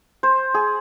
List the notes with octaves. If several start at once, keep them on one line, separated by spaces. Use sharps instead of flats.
C5
G#4